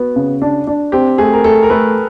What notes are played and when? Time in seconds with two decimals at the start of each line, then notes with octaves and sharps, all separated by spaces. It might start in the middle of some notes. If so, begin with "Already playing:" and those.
Already playing: B3 F#4
0.16 C#3
0.42 D4
0.67 D4
0.92 C4 G4
1.18 A3 G#4
1.33 A#4
1.44 A3 A4
1.63 A#4
1.70 A3 B4